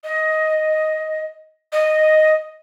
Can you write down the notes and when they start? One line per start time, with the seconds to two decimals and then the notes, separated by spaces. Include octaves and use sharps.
0.04 D#5
1.73 D#5